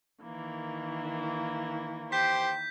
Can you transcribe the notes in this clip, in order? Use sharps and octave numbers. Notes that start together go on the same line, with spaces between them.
D#3 E3 A#3
G4 C5 G5 G6 B6